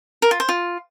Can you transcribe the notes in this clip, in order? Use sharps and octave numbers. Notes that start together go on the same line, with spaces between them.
A#4
F4
C5
F4